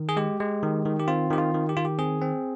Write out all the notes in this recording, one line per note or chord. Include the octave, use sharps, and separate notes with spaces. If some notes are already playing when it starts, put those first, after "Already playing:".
Already playing: D#3
G#4
G#3 G4
G#3
D#3
D#3
G4
C4 F4
D#3 G4
F4
D#3
G4
D#3 F4
G4
C4 G#4
C4